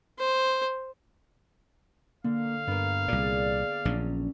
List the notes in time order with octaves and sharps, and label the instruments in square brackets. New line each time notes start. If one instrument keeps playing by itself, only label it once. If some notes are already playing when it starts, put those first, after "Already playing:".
[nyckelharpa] C5
[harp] D3 [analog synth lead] A#3 [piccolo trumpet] F5
[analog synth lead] G2 [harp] A#3 B3
[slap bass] C2 A#2 [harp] G#4 [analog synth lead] D5
[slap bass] A#1 A#2 [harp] F#3 C#4 D4